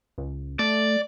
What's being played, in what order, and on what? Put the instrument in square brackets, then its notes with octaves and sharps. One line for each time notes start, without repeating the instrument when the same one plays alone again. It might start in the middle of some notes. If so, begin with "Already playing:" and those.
[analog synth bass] C#2
[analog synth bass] A3 [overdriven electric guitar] D5